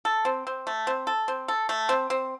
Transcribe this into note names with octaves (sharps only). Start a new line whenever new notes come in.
A4
C4
C4
A3
C4
A4
C4
A4
A3
C4
C4